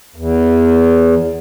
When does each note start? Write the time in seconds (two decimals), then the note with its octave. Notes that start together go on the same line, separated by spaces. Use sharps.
0.16 E2